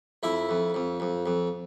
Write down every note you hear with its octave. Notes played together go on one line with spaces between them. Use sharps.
F2 E4 E5
F2
F2
F2
F2